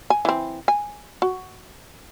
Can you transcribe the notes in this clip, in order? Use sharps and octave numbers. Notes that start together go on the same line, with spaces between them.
G#5
E3 C4
G#5
F#4